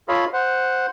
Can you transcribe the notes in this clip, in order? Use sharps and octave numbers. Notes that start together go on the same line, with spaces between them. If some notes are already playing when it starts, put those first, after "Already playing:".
F4 A4 C#5 D#5 F5 B5
C5 F#5